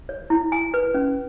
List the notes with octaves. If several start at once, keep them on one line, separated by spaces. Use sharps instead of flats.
C#5
E4
G#5
B4
C#4